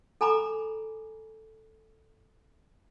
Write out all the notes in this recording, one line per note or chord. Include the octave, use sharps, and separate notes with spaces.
A4 G#5 A#5 B5 D6